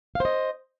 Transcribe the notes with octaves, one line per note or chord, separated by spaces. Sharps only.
C5 D#5 F5